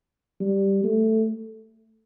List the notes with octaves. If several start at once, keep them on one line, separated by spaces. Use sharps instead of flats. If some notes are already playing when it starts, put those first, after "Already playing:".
G3
A3